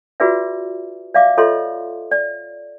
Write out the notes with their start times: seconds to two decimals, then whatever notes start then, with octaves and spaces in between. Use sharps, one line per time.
0.20 F4 F#4 G#4 B4 D5 E5
1.14 D5 E5 F5 D6
1.37 F4 A4 C#5 D#5 E5 C6
2.11 D5